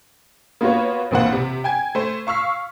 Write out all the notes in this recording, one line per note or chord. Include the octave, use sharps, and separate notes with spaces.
A#3 B3 F4 F#4 C#5
A#1 F2 E3 A#3 C5 F#5
C3
G5 G#5 G#6
A3 C5
F5 C#6 E6 F6 B6